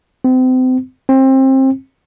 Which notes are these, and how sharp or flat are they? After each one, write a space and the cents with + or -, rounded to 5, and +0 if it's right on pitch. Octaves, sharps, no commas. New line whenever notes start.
C4 -35
C4 +25